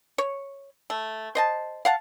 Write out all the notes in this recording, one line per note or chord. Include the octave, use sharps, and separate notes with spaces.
C#5
A3
C5 D#5 A5
F5 F#5 A5